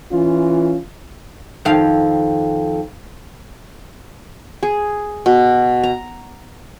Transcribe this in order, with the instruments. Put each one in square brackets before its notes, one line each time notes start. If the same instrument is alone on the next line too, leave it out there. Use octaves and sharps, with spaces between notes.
[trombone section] E3 C#4 F4
[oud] F2 D#3 F5
[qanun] G#4
B2
A#5